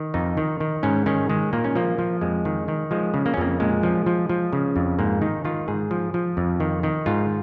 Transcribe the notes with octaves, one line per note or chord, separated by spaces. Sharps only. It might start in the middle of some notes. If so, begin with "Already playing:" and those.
Already playing: D#3
F2 D#4
D#3
D#3
G#2 C#4
D#3 C#4
D#3 G#3
A#2 A#3
C#4
F3 A#3
F3
F2 G#3
D#3
D#3
F3 G#3
C#3
A#3
C#4
F2 A#3
A#2 G#3
F3
F3
F3
C#3
F2
G#2 A#3
D#3 D#4
D#3 F4
G#2 G#4
F3
F3
F2
D#3
D#3
G#2 F4